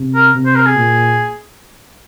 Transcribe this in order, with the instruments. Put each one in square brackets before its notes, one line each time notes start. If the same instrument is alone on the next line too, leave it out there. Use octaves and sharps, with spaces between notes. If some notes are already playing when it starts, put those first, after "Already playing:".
Already playing: [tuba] C3
[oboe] A#4
[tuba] C3
[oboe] C5
A#4
G#4
[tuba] A#2